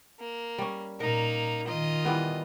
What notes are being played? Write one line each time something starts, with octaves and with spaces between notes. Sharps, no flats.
A#3
G3 C#4
A#2 A#3 D#4 A#4
D#3 D#4 F4 D#5
E3 G3 B3